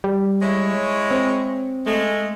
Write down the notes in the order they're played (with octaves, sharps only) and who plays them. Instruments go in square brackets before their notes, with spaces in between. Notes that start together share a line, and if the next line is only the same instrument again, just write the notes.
[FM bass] G3
[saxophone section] G#3 E4 C#5
[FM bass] C4
[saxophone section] G#3 A3